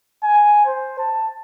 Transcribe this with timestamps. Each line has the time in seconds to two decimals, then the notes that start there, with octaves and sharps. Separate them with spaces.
0.24 G#5
0.66 C5
0.99 A5